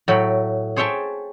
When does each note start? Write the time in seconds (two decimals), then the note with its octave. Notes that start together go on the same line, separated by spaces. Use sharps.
0.08 A2 F#3 G5 B5
0.76 G#4 C5 C#5 E5 G5 A5